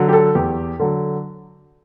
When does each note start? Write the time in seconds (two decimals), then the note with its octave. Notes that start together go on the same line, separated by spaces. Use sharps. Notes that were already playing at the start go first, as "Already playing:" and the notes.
Already playing: D3 F#3
0.09 G4
0.13 A4
0.35 E2 G4
0.79 D3 F#3 A4